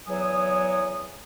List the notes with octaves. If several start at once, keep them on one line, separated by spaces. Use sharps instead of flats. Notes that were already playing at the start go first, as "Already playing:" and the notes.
E2 F#3 G#5 D#6